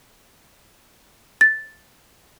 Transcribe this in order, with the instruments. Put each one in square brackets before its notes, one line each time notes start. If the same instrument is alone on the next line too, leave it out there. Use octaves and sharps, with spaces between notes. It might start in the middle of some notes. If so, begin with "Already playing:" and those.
[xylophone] A6